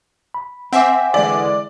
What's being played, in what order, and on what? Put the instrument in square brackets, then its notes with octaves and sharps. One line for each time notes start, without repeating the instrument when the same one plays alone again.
[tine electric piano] B5
[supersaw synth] C4 E5 [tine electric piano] F#5 G#5 D6
[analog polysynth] D3 E3 G#3 [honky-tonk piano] D5